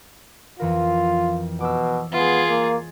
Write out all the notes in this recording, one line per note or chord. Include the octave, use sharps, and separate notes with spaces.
F2 E3 F4 A#4
B2 D6 E6
G#3 B3 F4 G#4
A#3